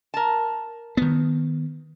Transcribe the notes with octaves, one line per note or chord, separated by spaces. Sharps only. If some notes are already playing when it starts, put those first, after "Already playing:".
A#4 A5
D#3 B3